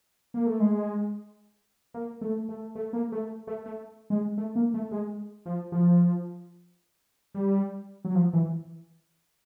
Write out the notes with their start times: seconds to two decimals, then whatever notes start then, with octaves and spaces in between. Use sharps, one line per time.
0.34 A#3
0.47 A3
0.60 G#3
1.94 A#3
2.21 A3
2.49 A3
2.75 A3
2.93 A#3
3.12 A3
3.47 A3
3.66 A3
4.10 G#3
4.38 A3
4.56 A#3
4.74 A3
4.91 G#3
5.46 F3
5.72 F3
7.34 G3
8.05 F#3
8.15 F3
8.33 E3